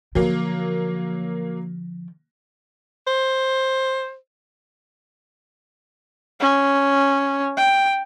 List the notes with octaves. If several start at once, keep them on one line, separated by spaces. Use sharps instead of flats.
D3 F3 F#3 A#3
C5
C#4
G5